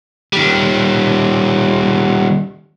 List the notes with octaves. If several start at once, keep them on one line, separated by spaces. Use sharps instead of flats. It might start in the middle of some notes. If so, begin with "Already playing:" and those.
D#3 G3